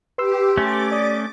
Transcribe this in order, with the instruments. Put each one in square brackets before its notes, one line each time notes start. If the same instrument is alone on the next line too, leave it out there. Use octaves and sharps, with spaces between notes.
[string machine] G4 [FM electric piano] B4 C6 E6
[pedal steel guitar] A3 C#4 [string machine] D6 A6
[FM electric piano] D5 D#6